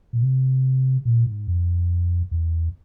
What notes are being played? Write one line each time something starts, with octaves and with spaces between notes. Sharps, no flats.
A#2
C3
A#2
G#2
F2
E2